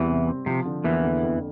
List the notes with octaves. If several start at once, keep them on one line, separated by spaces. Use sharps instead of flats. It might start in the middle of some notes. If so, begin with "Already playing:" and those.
Already playing: E2 E3 G3 C4
C3
C4
C3 F3
D3
E2 E3 A#3
D3
F2